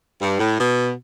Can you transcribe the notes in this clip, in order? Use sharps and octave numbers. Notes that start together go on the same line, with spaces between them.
G2
A2
B2